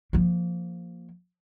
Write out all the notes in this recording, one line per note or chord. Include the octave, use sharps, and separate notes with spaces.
F3 A#3